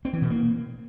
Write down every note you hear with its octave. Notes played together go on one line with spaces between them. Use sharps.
C4
E3
B2
A#3